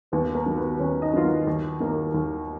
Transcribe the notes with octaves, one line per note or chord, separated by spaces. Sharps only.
D#2 B3 B4
A#3 A#4
D#3 F#3
B3 B4
D#2 C#4 C#5
D#4 D#5
D#3 F#3 F4
F#3 F#4
D#2
D#3 A#3
D#2